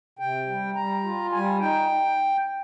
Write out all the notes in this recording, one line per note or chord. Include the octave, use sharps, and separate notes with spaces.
C3 G5
G3
G3 A#5
F4
G3 G#5
D#4 G5